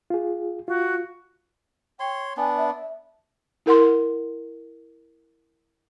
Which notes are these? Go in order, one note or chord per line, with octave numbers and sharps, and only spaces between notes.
F4 G#4
F4 F#4
C#5 G5 C6
B3 D4 G#5
E5
E4 A#4 F#5 C6